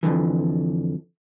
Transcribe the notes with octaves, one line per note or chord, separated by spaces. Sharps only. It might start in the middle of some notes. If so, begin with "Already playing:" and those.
F2 B2 D3 E3